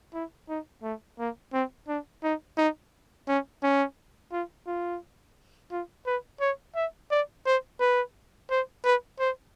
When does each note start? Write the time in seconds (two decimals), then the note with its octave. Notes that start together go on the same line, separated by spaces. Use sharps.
0.14 E4
0.48 D#4
0.83 A3
1.19 A#3
1.53 C4
1.88 D4
2.23 D#4
2.57 D#4
3.28 C#4
3.63 C#4
4.32 F4
4.66 F4
5.71 F4
6.06 B4
6.41 C#5
6.75 E5
7.11 D5
7.46 C5
7.80 B4
8.50 C5
8.85 B4
9.19 C5